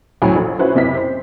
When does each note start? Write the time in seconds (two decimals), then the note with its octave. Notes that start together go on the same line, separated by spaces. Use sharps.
0.22 D2 A2 C#3 F#3 G#5 B5
0.35 A#1
0.59 C#4 E4 F#4 B4 C5
0.75 F#1 C3 E4 D#5 B6
0.95 C5